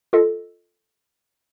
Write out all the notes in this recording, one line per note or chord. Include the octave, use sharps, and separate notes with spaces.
F4 A4 D#5